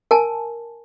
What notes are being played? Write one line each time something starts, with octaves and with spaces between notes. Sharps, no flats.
A#4 G#5 A5